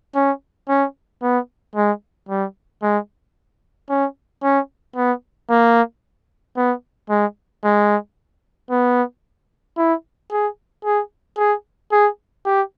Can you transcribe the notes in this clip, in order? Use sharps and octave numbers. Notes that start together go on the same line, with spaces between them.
C#4
C#4
B3
G#3
G3
G#3
C#4
C#4
B3
A#3
B3
G#3
G#3
B3
E4
G#4
G#4
G#4
G#4
G4